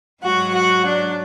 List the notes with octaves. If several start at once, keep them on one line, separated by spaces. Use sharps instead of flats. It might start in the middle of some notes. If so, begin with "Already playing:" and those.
G#2 F#3 F#4
F#4
D4